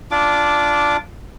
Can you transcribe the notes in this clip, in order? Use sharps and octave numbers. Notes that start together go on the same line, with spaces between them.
D4 F4 D6